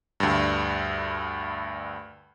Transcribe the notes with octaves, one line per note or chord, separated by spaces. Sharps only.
D2 G2